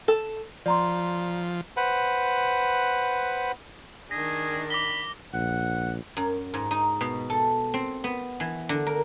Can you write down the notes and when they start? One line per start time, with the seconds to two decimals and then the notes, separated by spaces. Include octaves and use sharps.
0.08 A4
0.66 F3 D5 A#5 C6
1.77 B4 C5 F#5 B5
4.11 D#3 D4 G#4 A#6
4.70 B5 D6 A#6 G7
5.34 A#1 F#5
6.17 F#2
6.54 G#2
6.71 D#4
7.01 B2
7.30 A4
7.74 C4
8.04 B3
8.40 E3
8.69 D3
8.87 A#4